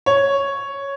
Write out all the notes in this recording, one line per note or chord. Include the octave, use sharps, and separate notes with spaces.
C#5